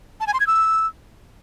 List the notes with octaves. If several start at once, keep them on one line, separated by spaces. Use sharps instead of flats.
A5
G#5
C6
G#6
E6